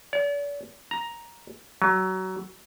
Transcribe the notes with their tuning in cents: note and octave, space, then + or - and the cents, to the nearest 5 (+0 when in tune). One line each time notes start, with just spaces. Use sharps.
D5 -40
A#5 +10
F#3 +25